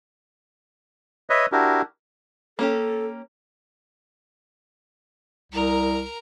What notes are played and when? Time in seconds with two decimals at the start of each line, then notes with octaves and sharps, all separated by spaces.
1.30 B4 C#5 D#5 E5
1.52 D4 E4 F#4 G4 A#4
2.59 A#3 C#4 G4 A4
5.52 C2 A#4 A#5